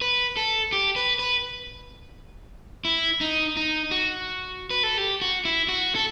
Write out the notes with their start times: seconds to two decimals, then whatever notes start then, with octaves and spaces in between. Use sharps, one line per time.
0.01 B4
0.37 A4
0.73 G4
0.96 B4
1.19 B4
2.85 E4
3.21 D#4
3.57 D#4
3.91 F#4
4.70 B4
4.83 A4
4.98 G4
5.22 F#4
5.45 E4
5.69 F#4
5.95 A4